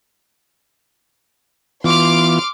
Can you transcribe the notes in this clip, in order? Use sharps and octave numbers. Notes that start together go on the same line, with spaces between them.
E3 B3 F4 C6 D6 F6